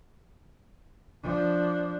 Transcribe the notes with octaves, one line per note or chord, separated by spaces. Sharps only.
F3 D4